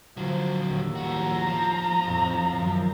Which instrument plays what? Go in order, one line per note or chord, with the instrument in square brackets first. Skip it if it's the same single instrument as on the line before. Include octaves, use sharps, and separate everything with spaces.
[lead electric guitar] D3 F#3 [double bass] F3
[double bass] D#2 A2
[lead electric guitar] F3 F#4 [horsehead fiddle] A#5
[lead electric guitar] F3
[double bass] F2 A2
F#2 D#3